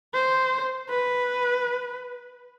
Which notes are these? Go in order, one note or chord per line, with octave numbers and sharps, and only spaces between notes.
C5
B4